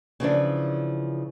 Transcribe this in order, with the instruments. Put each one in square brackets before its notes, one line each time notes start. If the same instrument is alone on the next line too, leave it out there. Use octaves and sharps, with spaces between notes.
[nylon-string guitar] C#3 E3 F3 D4